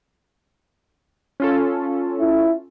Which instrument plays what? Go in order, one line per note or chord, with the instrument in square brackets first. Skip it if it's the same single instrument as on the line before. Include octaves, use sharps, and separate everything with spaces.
[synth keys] C#4 F4 A4
[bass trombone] E4